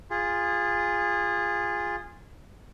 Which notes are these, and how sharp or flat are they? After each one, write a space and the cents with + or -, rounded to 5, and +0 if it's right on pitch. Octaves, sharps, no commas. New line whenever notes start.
F4 +0 G#4 -20